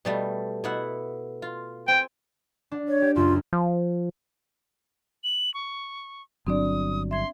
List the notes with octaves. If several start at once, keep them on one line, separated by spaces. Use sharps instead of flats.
B2 G3 A3
B2 E4 F#5
F4
C4 G5 G#5
D4
C#5
G4
C#2 F#2 F4
F3
F#7
C#6
G1 F#3 C4 D4 D5 D#6
E5 C6 G#6